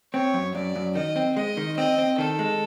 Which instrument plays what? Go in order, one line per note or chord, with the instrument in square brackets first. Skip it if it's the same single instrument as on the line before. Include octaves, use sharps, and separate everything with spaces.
[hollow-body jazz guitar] C4 [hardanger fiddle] C#5
[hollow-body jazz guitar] F#2
[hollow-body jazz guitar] F#2 [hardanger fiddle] D5
[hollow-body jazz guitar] F#2
[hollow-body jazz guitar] D#3 [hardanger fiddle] D#5
[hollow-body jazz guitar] C4
[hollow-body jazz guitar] G#3 [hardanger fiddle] D#5
[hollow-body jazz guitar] D#3
[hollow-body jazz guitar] C4 [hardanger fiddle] D#5
[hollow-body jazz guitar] C4
[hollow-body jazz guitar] D#3 [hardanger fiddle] A4
[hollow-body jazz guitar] G#3